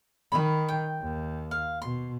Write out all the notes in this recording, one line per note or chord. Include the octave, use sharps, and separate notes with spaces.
D#3 D#5 B5
G5
D#2
F5
B2 C6